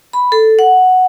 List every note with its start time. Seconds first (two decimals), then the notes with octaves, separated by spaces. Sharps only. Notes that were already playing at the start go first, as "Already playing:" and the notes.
0.13 B5
0.32 A4
0.59 F#5